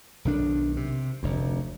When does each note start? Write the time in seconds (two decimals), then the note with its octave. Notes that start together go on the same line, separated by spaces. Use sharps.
0.25 B1 D#3 D4
0.76 C3
1.23 F1 D2